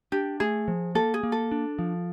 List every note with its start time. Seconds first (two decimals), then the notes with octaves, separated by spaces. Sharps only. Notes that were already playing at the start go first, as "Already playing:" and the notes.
0.12 D4 G4
0.40 A3 G#4
0.68 F3
0.95 A#3 A4
1.14 G#4
1.23 A#3
1.32 A4
1.52 D4
1.79 F3